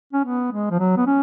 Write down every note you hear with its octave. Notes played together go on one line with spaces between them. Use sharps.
C#4
B3
G#3
F3
F#3
B3
C#4